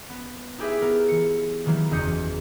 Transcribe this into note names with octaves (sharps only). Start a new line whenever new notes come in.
B3
D#4 E4 G4 G#4 B4 E5
B3 A#4
E3 C#7
D#3 E3 F#3 A#3 B3
F#1 E2 D#5 D#6 G6 C#7